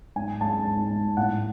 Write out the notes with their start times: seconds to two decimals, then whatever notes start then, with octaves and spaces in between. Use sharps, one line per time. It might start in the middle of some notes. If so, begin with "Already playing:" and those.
0.16 G#2 G#5
0.41 G#3 A5
0.67 G#2
0.92 G#3
1.17 A2 F#5